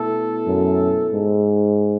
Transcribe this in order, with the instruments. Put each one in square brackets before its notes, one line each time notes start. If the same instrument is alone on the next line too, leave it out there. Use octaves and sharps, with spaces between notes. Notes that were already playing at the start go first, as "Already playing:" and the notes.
Already playing: [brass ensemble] B2 A3 E4 A4
[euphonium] F#2
G#2